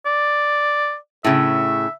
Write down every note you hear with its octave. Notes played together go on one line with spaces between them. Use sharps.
D5
A2 C#3 E5